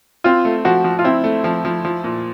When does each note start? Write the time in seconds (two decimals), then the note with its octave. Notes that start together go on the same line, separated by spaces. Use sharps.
0.24 C4 F4
0.45 A3
0.65 F3 F#4
0.84 F3
0.99 F4
1.04 C4 E4
1.24 A3
1.44 F3
1.65 F3
1.85 F3
2.04 A#2